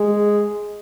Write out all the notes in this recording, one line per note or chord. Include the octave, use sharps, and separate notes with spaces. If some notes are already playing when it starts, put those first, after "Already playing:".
Already playing: G#3